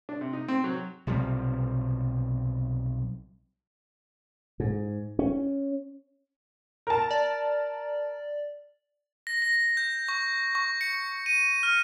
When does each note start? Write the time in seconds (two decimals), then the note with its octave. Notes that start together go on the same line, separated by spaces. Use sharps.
0.09 D4
0.21 C3
0.33 D#4
0.48 C4
0.64 F#3
1.07 B1 C3 F3 G3
4.60 G#2
5.19 C#4
6.87 A#4 A5
7.11 D5
9.27 A#6
9.42 A#6
9.77 G6
10.08 C#6
10.55 C#6
10.81 C#7
11.26 D#7
11.63 F6